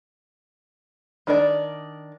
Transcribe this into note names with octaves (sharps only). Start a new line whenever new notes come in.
D#3 D4 A#4 D5